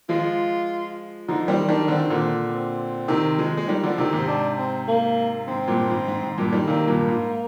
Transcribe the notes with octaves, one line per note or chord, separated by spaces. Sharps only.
F3 G#3 F4
D3 F3 D#4
D#3 G3 C4
D#3 G3 D4
D3 C4
D#3
A#2 D3
C4
C3 D#3
F3 G#3
G#3
D#3 G3
D3 F3
C3 D#3
G#2 C3
C4
D4
C4
A#3
G#2 C4
G2 A#2
G#2
G#2
G#2
G2 A#2
D#3 G3
C3 D#3 A#3
G2 A#2
G#2